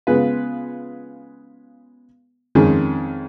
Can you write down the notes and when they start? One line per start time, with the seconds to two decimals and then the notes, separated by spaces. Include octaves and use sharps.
0.07 C#3 G#3 B3 F4 B4
2.55 F2 D#3 G#3 C#4